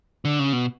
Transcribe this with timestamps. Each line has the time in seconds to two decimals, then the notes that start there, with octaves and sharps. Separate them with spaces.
0.25 D3
0.39 C#3
0.53 B2